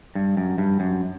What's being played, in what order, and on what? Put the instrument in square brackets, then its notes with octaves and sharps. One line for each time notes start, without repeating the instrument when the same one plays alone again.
[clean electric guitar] G2
F#2
G2
F#2